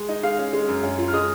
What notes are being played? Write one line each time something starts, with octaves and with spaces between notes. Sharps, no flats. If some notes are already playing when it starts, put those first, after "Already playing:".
Already playing: G#3
D#4
G#3 F5 F6
C#4
G#3
F#2
C#4
F4
F6
G#3 D#5 D#6